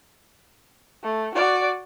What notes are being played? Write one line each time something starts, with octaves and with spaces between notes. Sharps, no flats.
A3
F#4 D5